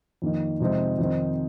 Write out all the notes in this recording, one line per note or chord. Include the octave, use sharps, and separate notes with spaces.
F2 D#3 A#3 D#4
F2 C3 G#3 C4 D#4
F2 D#3 C4 D#4